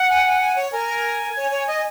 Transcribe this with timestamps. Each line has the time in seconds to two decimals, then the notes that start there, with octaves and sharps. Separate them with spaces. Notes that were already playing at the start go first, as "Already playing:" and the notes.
Already playing: F#5
0.10 G#5
0.26 G#5
0.41 G#5
0.56 C#5
0.72 A#4 G#5
1.36 C#5
1.51 C#5
1.67 D#5